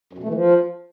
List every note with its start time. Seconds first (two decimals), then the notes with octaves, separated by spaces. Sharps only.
0.13 F#2
0.18 B2
0.24 A3
0.29 E3
0.34 F3